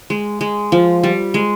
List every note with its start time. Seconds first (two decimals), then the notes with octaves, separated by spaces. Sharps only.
0.10 G#3
0.41 G#3
0.72 F3
1.03 G3
1.34 G#3